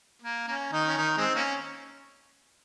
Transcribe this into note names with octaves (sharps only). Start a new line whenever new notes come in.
A#3
A#3 C#4
D#3 D#4
C#4
D#3 D#4
G#3 C4
A#3 C#4